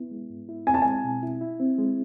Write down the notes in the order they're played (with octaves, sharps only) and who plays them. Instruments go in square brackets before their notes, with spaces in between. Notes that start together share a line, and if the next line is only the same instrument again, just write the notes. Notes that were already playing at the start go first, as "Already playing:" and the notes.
Already playing: [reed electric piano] B3 E4
G#3
G#2
E4
[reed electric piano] C4 [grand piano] G#5
[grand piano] A5
[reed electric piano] G#3 [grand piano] G#5
[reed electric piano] B2
E4
E4
C4
G#3